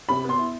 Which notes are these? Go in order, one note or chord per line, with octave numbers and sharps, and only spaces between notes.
C3 B5
B3 C6
E4